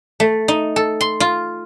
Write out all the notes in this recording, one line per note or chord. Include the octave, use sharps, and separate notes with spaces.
A3
D#4
A4
C6
F4